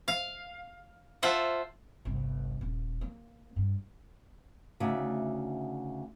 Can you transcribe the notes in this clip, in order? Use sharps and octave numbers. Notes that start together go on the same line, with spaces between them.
F5
F4 A4 C5 E5 F#5
G1 C2
D#1
A#3
G2
D2 C#3 D#4 D5 E5